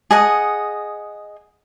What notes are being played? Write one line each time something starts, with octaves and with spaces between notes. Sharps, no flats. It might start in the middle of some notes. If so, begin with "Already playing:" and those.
G#4 D#5 F#5